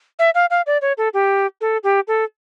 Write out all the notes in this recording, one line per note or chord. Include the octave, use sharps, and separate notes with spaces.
E5
F5
F5
D5
C#5
A4
G4
A4
G4
A4